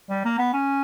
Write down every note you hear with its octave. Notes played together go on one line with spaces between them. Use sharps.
G3
A#3
B3
C#4